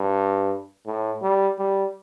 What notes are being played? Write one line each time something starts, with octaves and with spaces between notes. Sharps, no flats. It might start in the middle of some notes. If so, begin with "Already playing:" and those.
Already playing: G2
A2
G3
G3